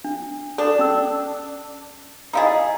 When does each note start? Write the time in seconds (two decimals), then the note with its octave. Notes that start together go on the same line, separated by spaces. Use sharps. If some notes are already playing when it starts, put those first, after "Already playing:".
0.05 D4
0.58 D4 A4
0.79 C#4 E6
2.33 D#4 E4 G#4 D#5 F5 A#5